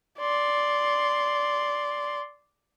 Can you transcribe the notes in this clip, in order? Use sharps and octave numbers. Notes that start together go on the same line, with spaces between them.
D5 C6